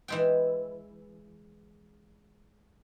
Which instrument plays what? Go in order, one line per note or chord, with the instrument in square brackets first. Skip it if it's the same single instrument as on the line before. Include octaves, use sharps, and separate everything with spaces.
[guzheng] E3 G#3 G5